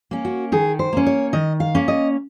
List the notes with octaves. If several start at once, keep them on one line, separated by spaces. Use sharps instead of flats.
A#3 C#4
F#4
D#3 G#4
C5
A#3 C#4
C#5
D#3 D#5
F5
A#3 C#4
D#5